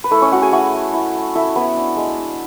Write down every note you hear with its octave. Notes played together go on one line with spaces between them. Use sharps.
B4
A3 E4 A4
C#4 C#5
A3 F#4 F#5
G#4 G#5
E4 F#4 F#5
A3
E4
A3
A3 E4 E5
B3 E4 B4
D4
G#3
D4